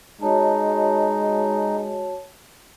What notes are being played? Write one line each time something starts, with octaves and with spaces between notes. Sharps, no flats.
G#3 D#4 F#4 C#5 A5